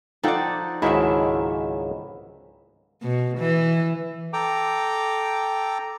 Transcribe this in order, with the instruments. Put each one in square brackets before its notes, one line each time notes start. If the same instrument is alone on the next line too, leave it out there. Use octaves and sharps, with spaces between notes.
[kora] F3 A4 F#5 [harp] D#4 D5 [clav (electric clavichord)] G5
[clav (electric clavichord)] C#2 G#2 D#3 [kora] F#3 D4 E5 [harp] E4
[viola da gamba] B2
E3
[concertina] A4 G5 A#5 D6